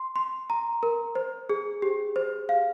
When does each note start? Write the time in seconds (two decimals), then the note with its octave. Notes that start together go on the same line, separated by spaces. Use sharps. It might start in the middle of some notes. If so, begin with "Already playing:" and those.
Already playing: C6
0.16 C6
0.50 A#5
0.83 A#4
1.15 C5
1.49 G#4
1.82 G4
2.16 C5
2.49 F5